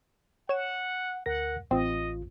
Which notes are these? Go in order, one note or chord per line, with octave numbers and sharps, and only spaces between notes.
C#5 F#5 E7
D2 A#4 F#5 A#6
A1 C4 F4 D#5